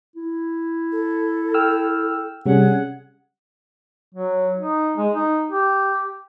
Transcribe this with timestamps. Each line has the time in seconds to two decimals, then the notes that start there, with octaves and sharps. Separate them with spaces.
0.16 E4
0.92 A4
1.54 G5 E6 F6
2.46 C3 G3 C#4 G#4 F#5
4.15 F#3
4.58 D#4
4.98 G#3
5.14 D#4
5.52 G4